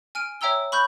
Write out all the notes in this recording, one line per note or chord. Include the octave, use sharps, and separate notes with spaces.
G#5 F6 D7 D#7
C#5 E5 G5 A#5 E6 G7
B5 C#6 F#6 G6